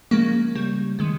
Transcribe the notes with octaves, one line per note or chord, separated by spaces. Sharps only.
C#3 F3 G#3 A#3
C#3 G3
C3 D#3 G#3